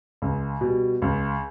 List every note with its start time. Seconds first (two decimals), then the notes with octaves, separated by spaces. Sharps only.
0.22 C#2
0.61 B2 G3
1.02 C#2